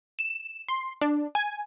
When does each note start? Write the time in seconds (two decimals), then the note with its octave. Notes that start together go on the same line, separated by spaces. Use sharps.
0.19 E7
0.68 C6
1.01 D4
1.35 G#5